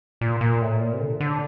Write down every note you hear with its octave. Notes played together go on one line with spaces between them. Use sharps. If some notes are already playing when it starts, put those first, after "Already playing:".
A#2
A#2
A2
A#2
C3
D3
D3